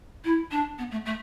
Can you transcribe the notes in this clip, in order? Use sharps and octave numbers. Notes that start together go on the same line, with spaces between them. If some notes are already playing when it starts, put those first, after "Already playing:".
E4
D4
B3
A3
A3